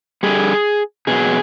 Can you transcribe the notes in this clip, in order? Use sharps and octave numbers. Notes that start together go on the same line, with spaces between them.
D3 G3 G#4
B2 F#3 G#4